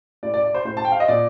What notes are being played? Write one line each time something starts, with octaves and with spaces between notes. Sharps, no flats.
A2 D5
D5
D5
C5
A2 C5
A5
G5
F5
D#5
A#2 D5